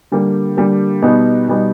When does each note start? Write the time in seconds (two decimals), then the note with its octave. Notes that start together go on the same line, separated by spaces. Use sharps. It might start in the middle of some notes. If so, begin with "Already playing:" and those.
0.12 D3 G3 A#3
0.57 D3 G3 A#3
1.02 B2 G3 B3 D#4
1.48 B2 G3 B3 D#4